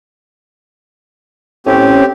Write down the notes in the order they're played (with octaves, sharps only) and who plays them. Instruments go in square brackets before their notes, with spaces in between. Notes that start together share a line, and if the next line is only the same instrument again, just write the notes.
[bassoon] A2 [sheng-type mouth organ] C4 G4 [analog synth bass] C#4